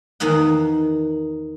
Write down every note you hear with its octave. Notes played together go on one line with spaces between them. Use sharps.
E2 D#3 A#3 D#4 F#5